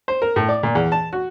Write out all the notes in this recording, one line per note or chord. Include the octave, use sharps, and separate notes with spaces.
C5
A#4
A2
D5
A#2
E2
A5
F#4